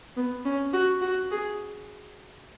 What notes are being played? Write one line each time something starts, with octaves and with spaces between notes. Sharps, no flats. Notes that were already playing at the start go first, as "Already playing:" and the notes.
B3
C#4
F#4
F#4
G#4